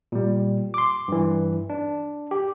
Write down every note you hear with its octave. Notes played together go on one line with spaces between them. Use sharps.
A#2 G3
C6 D6
G2 E3
D4
G4